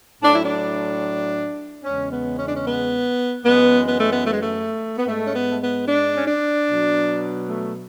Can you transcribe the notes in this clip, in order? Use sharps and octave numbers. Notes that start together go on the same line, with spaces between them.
A2 F#3 D4
E4
D4
E2 C#3 G#3 C#4
B3
C#4
D4
C#4
B3
F#2 E3 G#3 B3
B3
A3
B3
A3
G#3
A3
B3
G#2 G#3 A3
C#4
B3
A3
B3
D4
C#4
D4
B2 F#3
A3